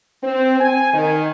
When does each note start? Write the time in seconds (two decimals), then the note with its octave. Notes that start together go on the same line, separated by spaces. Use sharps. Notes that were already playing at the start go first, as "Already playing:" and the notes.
0.23 C4
0.61 G#5
0.94 D#3